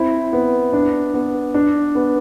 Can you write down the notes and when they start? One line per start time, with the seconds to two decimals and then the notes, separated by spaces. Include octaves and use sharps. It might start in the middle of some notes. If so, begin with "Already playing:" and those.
Already playing: C4 E4
0.33 B3
0.73 D4
1.14 B3
1.54 D4
1.95 B3